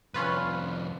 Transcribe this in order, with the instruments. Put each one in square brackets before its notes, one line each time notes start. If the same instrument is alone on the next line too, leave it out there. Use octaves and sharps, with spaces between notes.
[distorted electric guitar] C2 F2 [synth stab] C#4 F4 B4